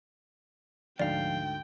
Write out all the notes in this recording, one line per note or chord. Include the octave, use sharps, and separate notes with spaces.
D2 G#2 D3 F3 D5 F5 G5